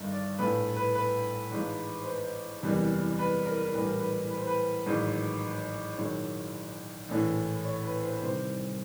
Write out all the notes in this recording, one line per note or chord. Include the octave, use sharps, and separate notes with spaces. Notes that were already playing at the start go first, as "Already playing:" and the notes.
Already playing: G1 G2 D#3 D#5
D5
A#1 A2 F3 B4
B4
B4
A1 G#2 F3
C5
B4
F#1 E2 C3 E3 G3
B4
A#4
A#1 A2 E3 G3 B4
A#4
B4
B4
C5
B4
A1 G#2 D#3 F#3
A#1 G#2 D#3 F#3 C#5
A#1 A2 E3
C#5
B4
C5
B4
C2 C3 D#3 G3 C5